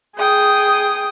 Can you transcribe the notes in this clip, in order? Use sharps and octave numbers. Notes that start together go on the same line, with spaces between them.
G#4 G5 D#6